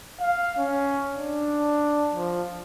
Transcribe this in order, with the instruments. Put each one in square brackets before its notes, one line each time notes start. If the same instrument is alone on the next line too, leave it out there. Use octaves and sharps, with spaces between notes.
[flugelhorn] F5
C#4
D4
F3